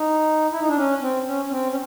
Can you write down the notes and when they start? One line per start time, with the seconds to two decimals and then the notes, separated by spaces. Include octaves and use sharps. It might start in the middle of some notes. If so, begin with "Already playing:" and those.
Already playing: D#4
0.51 E4
0.60 D#4
0.68 D4
0.77 C#4
1.01 C4
1.27 C#4
1.45 C#4
1.51 C4
1.71 C#4